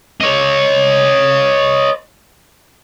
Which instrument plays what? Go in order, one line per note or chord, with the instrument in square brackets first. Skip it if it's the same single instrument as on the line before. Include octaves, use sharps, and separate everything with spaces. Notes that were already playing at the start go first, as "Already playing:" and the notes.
[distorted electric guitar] C#5 D#5